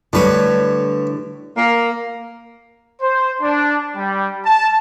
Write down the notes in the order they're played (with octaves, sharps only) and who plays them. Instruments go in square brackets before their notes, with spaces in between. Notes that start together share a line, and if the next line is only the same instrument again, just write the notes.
[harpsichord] A2 B4 C#5 [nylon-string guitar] D3 G3
[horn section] A#3
[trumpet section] C5
D4
G3
A5